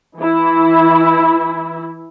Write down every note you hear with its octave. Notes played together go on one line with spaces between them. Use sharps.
E3 E4